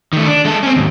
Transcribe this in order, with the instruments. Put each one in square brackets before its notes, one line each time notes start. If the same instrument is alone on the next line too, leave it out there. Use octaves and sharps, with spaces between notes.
[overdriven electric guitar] D#3 A3
D4
G#3 A4
C4 C#4
D#2 G#2